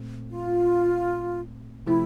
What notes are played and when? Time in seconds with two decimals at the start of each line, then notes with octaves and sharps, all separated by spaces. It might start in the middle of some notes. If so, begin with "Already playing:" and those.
Already playing: A#2 A3 C4
0.30 F4
1.87 C3 F3 A3 C4 E4